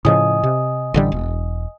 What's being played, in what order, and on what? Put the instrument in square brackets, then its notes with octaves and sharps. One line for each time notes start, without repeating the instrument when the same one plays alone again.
[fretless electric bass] A2 C#3 F3 [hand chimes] D#5 G#5 D#6
[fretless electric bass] C3
A1 D3 G3
E1